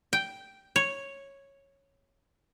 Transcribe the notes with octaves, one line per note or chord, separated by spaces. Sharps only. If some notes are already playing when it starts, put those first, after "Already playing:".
G5
C#5